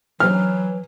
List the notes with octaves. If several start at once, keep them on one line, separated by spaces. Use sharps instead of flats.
E3 F#3 F6